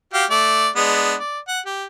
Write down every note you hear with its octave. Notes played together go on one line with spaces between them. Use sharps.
F#4 G4 F5
A3 D5
G#3 B3 D4
D5
F#5
G4